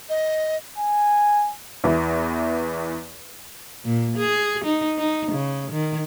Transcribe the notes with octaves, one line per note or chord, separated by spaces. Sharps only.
D#5
G#5
E2 E3
A#2
G#4
D#4
D#4
C#3
D#3